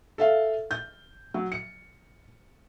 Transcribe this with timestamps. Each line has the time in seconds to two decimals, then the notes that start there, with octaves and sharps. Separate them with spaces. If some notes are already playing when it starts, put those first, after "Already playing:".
0.18 A4 E5 F5
0.71 G6
1.34 F#3
1.52 C#7